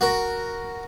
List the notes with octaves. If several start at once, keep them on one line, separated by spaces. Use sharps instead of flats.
F#4 A#4